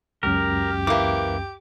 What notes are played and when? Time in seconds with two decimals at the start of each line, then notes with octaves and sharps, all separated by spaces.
0.23 C#2 F#2 G4 A#4
0.87 E3 A#3 D6